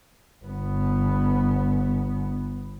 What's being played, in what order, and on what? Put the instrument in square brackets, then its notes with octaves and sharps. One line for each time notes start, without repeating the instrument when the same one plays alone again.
[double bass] G1 B3